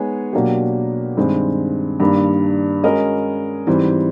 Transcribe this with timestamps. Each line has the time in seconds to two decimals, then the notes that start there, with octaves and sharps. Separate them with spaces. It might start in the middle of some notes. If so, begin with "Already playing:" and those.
Already playing: G#3 B3 D#4 G#4 C#5
0.33 B2 F#3 A#3 D4 G4
1.17 G2 D#3 G#3 C4
2.00 G2 D#3 G3 A#3 D4
2.83 G#3 C#4 F#4 A#4 D#5
3.67 G#2 E3 G3 C4